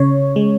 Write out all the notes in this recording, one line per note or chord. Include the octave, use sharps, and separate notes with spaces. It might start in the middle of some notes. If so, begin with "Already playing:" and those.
Already playing: C#3 C#5
G#3